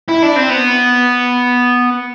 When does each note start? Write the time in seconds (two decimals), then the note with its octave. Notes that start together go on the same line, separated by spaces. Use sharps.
0.09 E4
0.23 D4
0.36 C4
0.50 B3